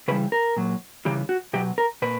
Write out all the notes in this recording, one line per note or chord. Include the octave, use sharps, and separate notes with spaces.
C#3 E3 G3 B4
A#4
A#2 F#3
C#3 E3 G3 G4
F#4
B2 F#3 G4
A#4
A#2 B4